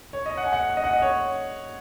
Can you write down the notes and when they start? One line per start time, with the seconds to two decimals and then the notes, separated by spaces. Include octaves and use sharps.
0.13 C#5
0.26 D#5
0.37 F#5
0.45 G#5
0.53 F#5
0.77 D#5
0.84 F#5
0.93 D#5
1.02 C#5